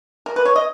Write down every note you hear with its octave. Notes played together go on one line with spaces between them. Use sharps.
A#4
B4
C#5
D#5